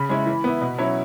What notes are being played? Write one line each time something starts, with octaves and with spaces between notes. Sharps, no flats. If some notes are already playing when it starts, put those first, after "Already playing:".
Already playing: C#3 B5
G#3 C#4 E4
E3
B3 E4
B2
F#3 C#4 E4